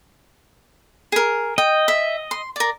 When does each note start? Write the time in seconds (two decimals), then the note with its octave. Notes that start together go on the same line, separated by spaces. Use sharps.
1.12 G#4 A#4
1.58 D#5 G5
1.88 E5
2.31 C6
2.56 A#4 D5